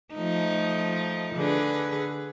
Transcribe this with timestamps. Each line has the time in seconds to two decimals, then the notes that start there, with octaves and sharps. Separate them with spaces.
0.14 F3 A3 D#4
1.35 D3 G#4 B4